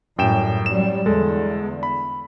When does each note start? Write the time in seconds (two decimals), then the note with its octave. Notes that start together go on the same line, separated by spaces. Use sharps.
0.18 F#2 A2 G3 G5 E7
0.66 F#3 G3 E7
1.06 E2 D3 G#3 A4
1.83 B5